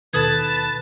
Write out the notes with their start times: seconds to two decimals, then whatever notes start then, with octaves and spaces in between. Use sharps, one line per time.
0.13 D#2 B2 D#3 A4 B4 A5 D#6 G#6